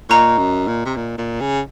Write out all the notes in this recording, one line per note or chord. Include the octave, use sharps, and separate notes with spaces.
A#2 D#5 A#5 C#6
F#2
A#2
C3
A#2
A#2
C#3